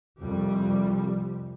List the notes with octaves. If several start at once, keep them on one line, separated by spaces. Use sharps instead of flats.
C2 F2 G3